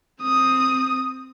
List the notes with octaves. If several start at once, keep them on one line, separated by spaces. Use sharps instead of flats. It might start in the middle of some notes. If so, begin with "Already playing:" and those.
C4 D#6